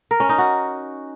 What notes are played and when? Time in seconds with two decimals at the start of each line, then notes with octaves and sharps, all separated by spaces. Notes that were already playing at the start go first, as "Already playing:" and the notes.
0.11 A#4
0.20 C#4
0.29 D#4
0.38 F#4